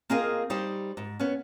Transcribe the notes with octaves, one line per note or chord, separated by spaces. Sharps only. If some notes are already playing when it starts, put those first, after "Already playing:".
A#3 C4 F4 G#4 A#4 D#5
G3 D#4 G4 C5
G#2
B3 C#4